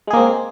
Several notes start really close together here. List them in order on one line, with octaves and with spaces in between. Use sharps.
G#3 G#4 A#3 C4